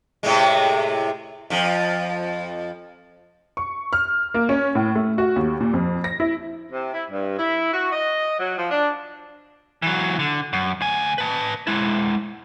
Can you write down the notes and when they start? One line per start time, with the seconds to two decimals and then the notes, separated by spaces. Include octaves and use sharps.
0.23 A2 C3 G#3
1.50 F2 F3
3.57 C#6
3.93 F6
4.34 A#3
4.49 C#4
4.75 A2
4.95 A3
5.18 F#4
5.36 D#2
5.60 A#2
5.74 F2
6.04 A#6
6.20 E4
6.71 C3
6.93 E4
7.11 G2
7.38 E4
7.73 F#4
7.92 D#5
8.39 F#3
8.58 F3
8.71 D4
9.82 E3 F#3
10.19 D3
10.53 F#2
10.81 D2 G#5
11.18 B4 A5
11.67 G#3 E4